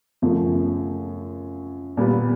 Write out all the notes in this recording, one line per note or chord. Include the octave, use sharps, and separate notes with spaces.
F#2 C#3 F3 A3
A#2 G3 B3